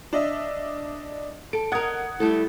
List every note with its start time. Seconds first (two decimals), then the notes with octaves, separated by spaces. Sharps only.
0.13 D4 D#5 E5
1.53 A4 D7
1.72 A#4 D#5 F#5 D#6 G#6
2.20 G3 A3 E4 A4